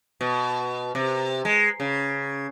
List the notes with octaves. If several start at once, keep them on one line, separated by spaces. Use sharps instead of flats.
B2
C3
G#3
C#3